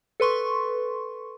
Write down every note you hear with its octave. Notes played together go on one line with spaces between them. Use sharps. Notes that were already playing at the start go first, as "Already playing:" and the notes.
A4 B4 C6 C#6